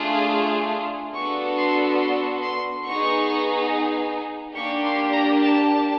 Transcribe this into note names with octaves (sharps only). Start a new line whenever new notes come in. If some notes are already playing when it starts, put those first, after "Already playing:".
Already playing: A3 D4 F4 G#4
B3 D4 F#4 A4 C#6
C6
C6
C6
B3 D#4 G#4 C#6
A#3 D4 G4 C#6
C6
A#5
A5